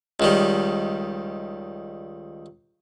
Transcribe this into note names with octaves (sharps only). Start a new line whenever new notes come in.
C#2 D#3 G3